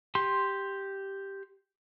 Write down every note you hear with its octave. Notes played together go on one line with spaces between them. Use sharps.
G4 C6